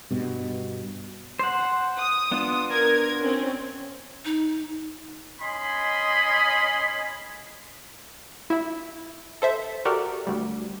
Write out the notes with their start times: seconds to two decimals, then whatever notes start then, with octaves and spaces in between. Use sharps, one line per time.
0.11 G2 B2
1.39 C5 F#5
1.97 D#6
2.32 B3 D4 F4
2.70 A#4 G#6
3.22 C4 C#4
4.25 D#4
5.42 C#4 D#5 G#5 B5 C6
8.50 E4 E5
9.42 A4 C5 E5
9.85 F#4 G4 A4 A#4 D5
10.27 D2 G3